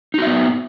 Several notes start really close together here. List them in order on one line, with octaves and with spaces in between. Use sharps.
D#4 F#4 E5 B3